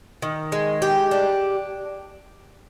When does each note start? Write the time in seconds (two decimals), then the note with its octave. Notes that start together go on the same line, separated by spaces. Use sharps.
0.22 D#3
0.52 G#3
0.82 G4
1.11 D4